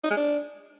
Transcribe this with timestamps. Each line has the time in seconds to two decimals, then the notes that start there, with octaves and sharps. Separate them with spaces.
0.04 D#4
0.10 G#3
0.17 D4